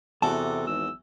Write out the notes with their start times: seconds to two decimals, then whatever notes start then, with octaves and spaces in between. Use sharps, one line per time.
0.22 E2 C3 F#4 A4 A5 D6
0.67 G#1 E6